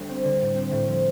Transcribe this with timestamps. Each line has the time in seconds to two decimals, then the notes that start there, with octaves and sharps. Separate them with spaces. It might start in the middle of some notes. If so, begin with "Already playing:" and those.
Already playing: D2 G3
0.09 C4
0.24 D3
0.41 A2
0.56 C4
0.72 A2
0.88 F3